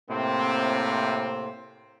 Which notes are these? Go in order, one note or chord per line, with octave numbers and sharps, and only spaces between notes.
A2 C3 A#3 C4